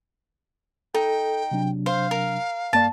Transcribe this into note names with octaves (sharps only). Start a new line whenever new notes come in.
D#4 A4 G5
C3 F#3 D4
C5 F5
A#4
G2 A#3 D5 A5